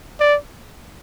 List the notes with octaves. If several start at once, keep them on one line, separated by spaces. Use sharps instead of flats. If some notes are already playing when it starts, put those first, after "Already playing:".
D5